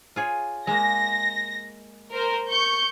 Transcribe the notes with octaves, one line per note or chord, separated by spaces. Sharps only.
F4 G#4 C#5
G#3 A#3 A#6
A#4 C5
C#6 G6